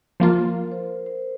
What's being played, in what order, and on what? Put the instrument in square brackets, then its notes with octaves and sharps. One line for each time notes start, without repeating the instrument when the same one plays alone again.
[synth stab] F3 A#3 F4 [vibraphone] A#4
[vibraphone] C5
C5